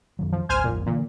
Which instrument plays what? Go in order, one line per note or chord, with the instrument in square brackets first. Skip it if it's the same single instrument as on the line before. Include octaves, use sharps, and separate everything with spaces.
[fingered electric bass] F#2 D#3 F#3
[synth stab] F3
[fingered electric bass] G#1 D2 [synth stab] C5 G#5 F6
[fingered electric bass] D#1 A#1 F#2 [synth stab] A#2
[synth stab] A#2 [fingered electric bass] D3 E3